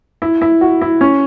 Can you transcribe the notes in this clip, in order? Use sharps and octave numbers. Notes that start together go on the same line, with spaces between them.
E4
E4
F#4
E4
C#4